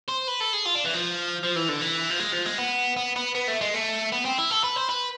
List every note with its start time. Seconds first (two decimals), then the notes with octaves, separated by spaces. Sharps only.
0.08 C5
0.28 B4
0.40 A4
0.53 G#4
0.66 F4
0.76 D4
0.86 E3
0.95 F3
1.43 F3
1.56 E3
1.69 D3
1.81 E3
2.10 F3
2.20 G#3
2.32 F3
2.45 G#3
2.58 B3
2.97 B3
3.16 B3
3.35 B3
3.48 A3
3.61 G#3
3.74 A3
4.12 B3
4.25 C4
4.38 E4
4.50 A4
4.64 B4
4.76 C5
4.89 B4